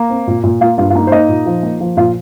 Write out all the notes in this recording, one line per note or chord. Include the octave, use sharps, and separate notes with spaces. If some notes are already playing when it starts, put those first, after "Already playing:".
Already playing: A#3
C4
A#2
A#2
A#3 F4
G2 F4
F4
A#3 D#4
C5
A#3 D#4 D#5
A#2
F3
A#3
F3
A#2 F4 F5